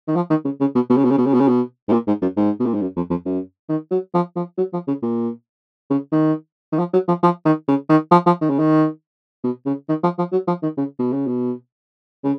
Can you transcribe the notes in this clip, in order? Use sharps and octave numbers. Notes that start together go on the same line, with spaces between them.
D#3
F3
D#3
C#3
C#3
B2
B2
C#3
B2
C#3
B2
C#3
B2
C#3
B2
G#2
A#2
G#2
F#2
G#2
B2
A#2
G#2
F#2
F2
F2
F#2
D#3
F#3
F3
F3
F#3
F3
C#3
A#2
C#3
D#3
D#3
F3
F#3
F3
F3
D#3
C#3
D#3
F3
F3
D#3
C#3
D#3
B2
C#3
D#3
F3
F3
F#3
F3
D#3
C#3
B2
C#3
B2
C#3